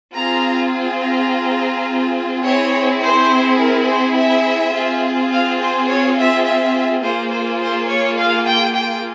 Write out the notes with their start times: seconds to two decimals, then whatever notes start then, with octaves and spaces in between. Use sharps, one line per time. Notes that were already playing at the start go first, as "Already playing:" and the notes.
0.15 C4 F4 G#4 A#5
1.01 A#5
2.45 C4 E4 G#4 C#5
3.02 C5
3.59 A#4
3.88 C5
4.17 E5
4.74 C4 F4 G#4
5.32 F5
5.60 C5
5.88 C#5
6.18 E5
6.45 E5
7.03 A#3 F4 G#4 C5
7.32 C5
7.60 C5
7.88 C#5
8.17 F5
8.47 G5
8.75 G5